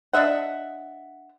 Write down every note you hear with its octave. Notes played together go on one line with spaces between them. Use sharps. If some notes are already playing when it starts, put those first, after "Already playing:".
D4 D#5 E5 F#5